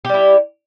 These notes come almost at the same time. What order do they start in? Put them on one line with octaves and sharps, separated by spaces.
G4 G3 E4